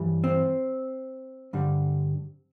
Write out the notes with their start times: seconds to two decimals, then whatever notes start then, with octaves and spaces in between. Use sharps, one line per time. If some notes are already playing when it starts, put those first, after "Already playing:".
Already playing: G2 E3 G3
0.24 C4
1.53 G2 D3 G3